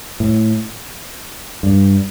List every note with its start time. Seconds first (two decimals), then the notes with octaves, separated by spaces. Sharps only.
0.20 A2
1.63 G2